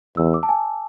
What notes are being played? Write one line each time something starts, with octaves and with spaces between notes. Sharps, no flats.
E2 E6
D6
A5
G#5